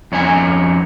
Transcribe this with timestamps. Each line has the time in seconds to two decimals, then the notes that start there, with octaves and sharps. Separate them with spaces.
0.12 F2 C#4 D#4 G#5